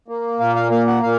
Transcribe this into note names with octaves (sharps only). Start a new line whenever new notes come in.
A#3
A#2 F5
F5
A#3 F5
F#5
A#2 F5